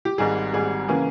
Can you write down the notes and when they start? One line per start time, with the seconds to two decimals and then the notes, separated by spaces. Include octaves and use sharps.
0.05 G4
0.18 G#1 G#2 G3 G#4
0.53 G#1 G#2 G3 G#4
0.88 C#3 E3 A#3 C#4